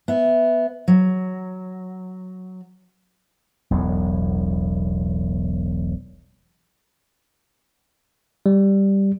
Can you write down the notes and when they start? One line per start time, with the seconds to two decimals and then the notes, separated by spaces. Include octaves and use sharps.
0.08 B3 E5
0.88 F#3
3.71 E1 B1 E2 A2
8.46 G3